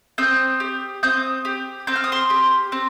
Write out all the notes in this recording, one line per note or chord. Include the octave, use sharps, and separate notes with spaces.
C4 D#6 G6
G4
C4 D#6 G6
G4
C4 G6
F6
D#6
C6 F6
G4
C4